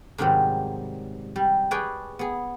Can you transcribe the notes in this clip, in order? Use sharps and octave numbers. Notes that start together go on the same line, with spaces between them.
G#2 C3 D#3 F#3 G3
G3
G#4 B4 C#5 D5 G5 G#5
B3 G#4